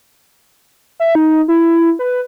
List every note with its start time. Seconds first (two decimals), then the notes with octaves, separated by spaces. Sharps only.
1.00 E5
1.15 D#4
1.48 E4
1.99 B4